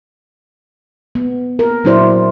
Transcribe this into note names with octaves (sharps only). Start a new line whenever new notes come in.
B3
A#4
A#2 F#3 D4 E4 C5 D5